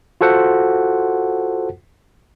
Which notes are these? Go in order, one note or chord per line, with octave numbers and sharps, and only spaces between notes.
F4 F#4 A4 C5 F#5